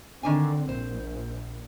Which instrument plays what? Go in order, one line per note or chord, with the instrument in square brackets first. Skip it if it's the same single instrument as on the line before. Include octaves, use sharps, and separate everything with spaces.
[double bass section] D3 C4 [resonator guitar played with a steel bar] D#3 D4 G#5
[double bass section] A#1 [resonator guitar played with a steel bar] C5